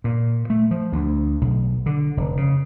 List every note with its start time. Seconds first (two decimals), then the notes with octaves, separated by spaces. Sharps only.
0.04 A#2
0.50 A3
0.71 F3
0.93 D2
1.41 B1
1.86 D3
2.17 F1
2.37 C#3